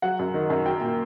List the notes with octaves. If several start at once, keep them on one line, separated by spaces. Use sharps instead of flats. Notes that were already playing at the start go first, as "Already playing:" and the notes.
F#3 F#5
F#2
D#3
F#2
F#3 G5
A#2